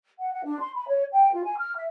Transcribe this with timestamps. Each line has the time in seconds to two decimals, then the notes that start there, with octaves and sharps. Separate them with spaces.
0.19 F#5
0.33 F#5
0.44 D4
0.60 C6
0.75 B5
0.88 C#5
1.12 G5
1.33 F4
1.44 G#5
1.58 F6
1.76 E5